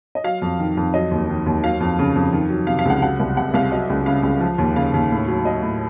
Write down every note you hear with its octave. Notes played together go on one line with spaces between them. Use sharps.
D#5
F#3 F5
F2
D#3
F2
F#3 D#5
D#2
D#3
D#2
F#3 F5
F2
C#3
F2
D#3
F#3
C3 F5
F5
C#2 F#5
F#3 F#5
C2
C3 F#5
C2 F5
F#3 D#5
C#2
C#3 F5
C#2
F3
D#2
C#3 F5
D#2
A2
F#3
F#3 D#5
A2